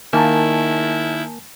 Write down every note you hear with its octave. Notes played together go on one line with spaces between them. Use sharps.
D#3 A#3 E4 G#5 A5